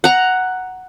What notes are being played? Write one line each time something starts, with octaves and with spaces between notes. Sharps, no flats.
F#5 A#5